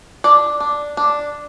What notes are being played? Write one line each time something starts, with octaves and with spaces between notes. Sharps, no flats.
D4 D5
D4
D4